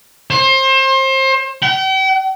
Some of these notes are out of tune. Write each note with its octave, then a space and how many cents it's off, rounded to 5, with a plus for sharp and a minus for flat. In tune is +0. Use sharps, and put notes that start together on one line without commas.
C5 +30
G5 -40